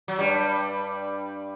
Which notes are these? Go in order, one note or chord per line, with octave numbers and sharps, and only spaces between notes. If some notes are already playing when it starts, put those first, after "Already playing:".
F#3
G2 G3